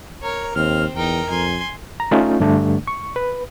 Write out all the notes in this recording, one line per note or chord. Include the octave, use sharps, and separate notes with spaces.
A#4 C#5
D#2 C4 F6
E2 D#4 A#4 G5
F2 G#5 C6
A#5
A3 C#4 D#4 F4
G2 D3 A3 D4
C#6
B4